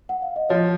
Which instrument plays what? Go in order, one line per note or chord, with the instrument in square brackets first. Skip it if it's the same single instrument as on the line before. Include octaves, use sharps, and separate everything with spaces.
[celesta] F#5
F5
D#5
[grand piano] F3 [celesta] C#5